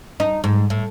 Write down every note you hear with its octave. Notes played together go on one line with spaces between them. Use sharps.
D#4
G#2
A2